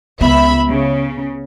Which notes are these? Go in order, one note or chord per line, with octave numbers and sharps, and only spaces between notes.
C#2 B3 E5 B5
C#3